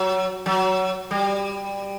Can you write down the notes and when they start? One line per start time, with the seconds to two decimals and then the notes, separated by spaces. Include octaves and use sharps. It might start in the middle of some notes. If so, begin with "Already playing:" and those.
Already playing: F#3
0.46 F#3
1.11 G3